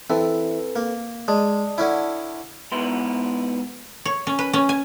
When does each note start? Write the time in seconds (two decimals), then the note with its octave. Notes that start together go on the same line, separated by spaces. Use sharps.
0.10 E3 C4 A4 B4
0.76 A#3
1.28 G#3 D5 A5 D#6
1.78 D3 C#4 E4
2.72 G#2 B3 E4 B4 C6
4.05 C#5
4.27 C#4
4.39 B4
4.53 C#4
4.69 G#5